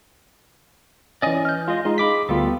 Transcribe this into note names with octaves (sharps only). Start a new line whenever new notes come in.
E3 C#4 D5 D#5 G#5
F6 G6
G#3 F4 D#5
G#3 D#4 F4 G#4 D#5
B5 D6 B6
D2 G3 B3 F4 A4